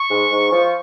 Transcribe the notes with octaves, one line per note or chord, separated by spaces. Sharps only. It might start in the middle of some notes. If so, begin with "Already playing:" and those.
Already playing: C#6
G#2
G#2
F3